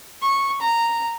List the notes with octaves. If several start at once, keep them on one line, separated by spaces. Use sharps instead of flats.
C#6
A#5